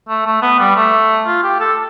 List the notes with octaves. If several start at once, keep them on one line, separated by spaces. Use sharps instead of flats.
A3
A3
B3
G3
A3
F4
G4
A4